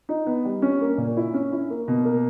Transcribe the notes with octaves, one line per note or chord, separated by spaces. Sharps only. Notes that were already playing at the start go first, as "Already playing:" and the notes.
D#4
B3
G3
C#4
A#3
A#2
E4
C#4
E4
A#3
B2
A#3